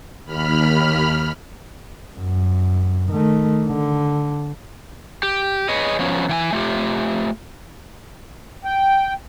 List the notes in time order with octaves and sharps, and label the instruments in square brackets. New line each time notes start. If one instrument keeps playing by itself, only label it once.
[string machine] D#2 B5 F6
[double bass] F#2
D#3 A3
D3
[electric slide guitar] G4
G#4 B4 C#5 D#5
F3 F#3 B3 C#4
E3 G5 G#5
A3 F4 G4
[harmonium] G5